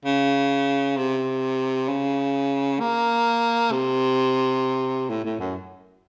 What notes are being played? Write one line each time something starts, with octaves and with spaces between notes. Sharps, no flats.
C#3
C3
C#3
A#3
C3
A2
A2
F#2